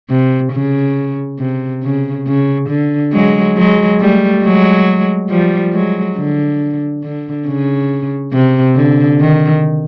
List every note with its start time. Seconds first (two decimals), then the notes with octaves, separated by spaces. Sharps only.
0.10 C3
0.52 C#3
1.39 C3
1.83 C#3
2.27 C#3
2.69 D3
3.13 F#3 G#3
3.57 F#3 G#3
4.00 G3 A3
4.43 F#3 G#3
5.29 F3 G3
5.73 F#3 G#3
6.17 D3
7.04 D3
7.47 C#3
8.33 C3
8.76 D3
9.20 D#3